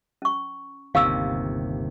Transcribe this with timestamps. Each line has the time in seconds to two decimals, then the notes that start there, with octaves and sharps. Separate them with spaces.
0.22 C#4 C#6
0.95 G1 D#2 C3 F5 C#6 E6